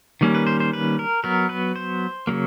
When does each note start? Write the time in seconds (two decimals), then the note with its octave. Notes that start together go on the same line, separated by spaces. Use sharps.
0.21 D#3 G3 A#3 C#4
0.35 B4
0.47 C5
0.60 C5
0.73 B4
0.99 A#4
1.24 F#3 B3 A#4
1.49 B4
1.76 C5
2.27 C#3 F#3 A#3